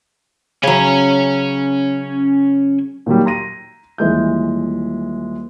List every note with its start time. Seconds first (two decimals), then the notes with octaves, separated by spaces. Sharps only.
0.63 C#3 F#3 C#4 G#5
3.06 A#2 D#3 F#3 G3
3.25 A#5 C6 A#6 D#7
3.98 D#1 E3 G#3 G6